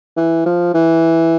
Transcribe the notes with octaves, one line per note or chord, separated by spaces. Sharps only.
E3
F3
E3